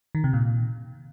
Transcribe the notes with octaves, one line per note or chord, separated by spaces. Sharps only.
D#3
C3
A#2